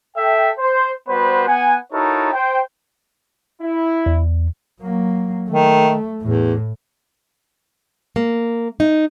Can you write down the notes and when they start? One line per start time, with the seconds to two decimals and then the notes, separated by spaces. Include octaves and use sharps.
0.17 A4 E5 G5
0.58 C5
1.09 G3 B3 F#4 B4 C5
1.47 B3 F#5 G#5
1.92 D#4 E4 F#4 A4 A#4 C#5
2.33 C5 G5
3.61 E4
4.06 E2
4.81 F#3 A#3
5.50 D#3 A3
6.22 E2 A2
8.16 A#3
8.80 D#4